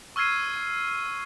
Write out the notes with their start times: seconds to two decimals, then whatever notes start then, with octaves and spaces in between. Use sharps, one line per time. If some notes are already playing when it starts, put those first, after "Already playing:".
0.16 C#6 E6 F6 G#6 C7 D#7